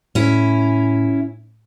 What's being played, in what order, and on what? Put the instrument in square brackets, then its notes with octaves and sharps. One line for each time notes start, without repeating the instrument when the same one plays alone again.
[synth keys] A2 [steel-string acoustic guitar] C#4 E4